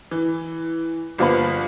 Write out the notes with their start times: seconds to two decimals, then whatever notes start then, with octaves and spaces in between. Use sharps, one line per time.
0.11 E3
1.18 G1 F3 A#3 B3 B5